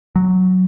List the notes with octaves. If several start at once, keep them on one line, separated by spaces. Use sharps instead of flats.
F#3